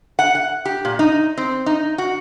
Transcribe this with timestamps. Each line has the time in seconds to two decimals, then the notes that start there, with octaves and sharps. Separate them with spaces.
0.19 F#5
0.35 F#5
0.65 G4
0.85 A#2
0.99 D#4
1.38 C4
1.66 D#4
1.98 F#4